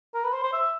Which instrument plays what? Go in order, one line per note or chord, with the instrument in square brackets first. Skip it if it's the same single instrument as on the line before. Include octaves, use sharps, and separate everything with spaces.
[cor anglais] A#4
B4
C5
C5
E5